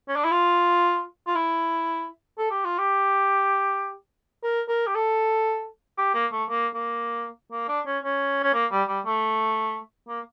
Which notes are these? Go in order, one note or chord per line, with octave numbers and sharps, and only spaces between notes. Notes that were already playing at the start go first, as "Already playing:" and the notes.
C#4
D4
E4
F4
F4
E4
A4
G4
F4
G4
A#4
A#4
G4
A4
G4
A#3
A3
A#3
A#3
A#3
D4
C#4
C#4
C#4
A#3
G3
G3
A3
A#3